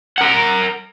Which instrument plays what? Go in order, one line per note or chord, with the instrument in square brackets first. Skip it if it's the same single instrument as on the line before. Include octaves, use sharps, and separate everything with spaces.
[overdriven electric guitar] A#4 F#5